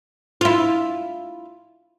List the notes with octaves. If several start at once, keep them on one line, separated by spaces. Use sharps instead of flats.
E4 F4